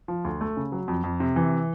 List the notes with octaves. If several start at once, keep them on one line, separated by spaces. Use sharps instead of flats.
F3
D2
A3
C#3
F#3
F2
F2
C3
E3